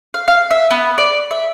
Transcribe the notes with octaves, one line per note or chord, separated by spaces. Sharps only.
F5
F5
E5
B3
D5
E5